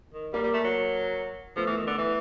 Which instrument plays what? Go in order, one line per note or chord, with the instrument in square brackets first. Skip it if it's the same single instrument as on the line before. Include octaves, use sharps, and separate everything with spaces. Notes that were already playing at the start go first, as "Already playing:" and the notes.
[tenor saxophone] D#3
[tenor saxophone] G3 [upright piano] A#3
[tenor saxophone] G3
A3
F#3
[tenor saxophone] F3 [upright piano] A3 B3
[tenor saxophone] E3
D#3
D3
E3